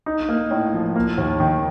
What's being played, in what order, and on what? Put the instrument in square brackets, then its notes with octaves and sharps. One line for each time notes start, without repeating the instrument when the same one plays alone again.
[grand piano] D#4
A#3
A2
F3
A#3
D#2
D#3